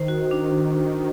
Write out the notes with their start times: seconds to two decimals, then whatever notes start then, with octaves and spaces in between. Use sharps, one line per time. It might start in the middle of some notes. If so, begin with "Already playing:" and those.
Already playing: D#3 C5
0.08 F#4
0.31 D4